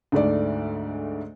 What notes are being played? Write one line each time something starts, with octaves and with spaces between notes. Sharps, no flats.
D2 G#2 A3 D5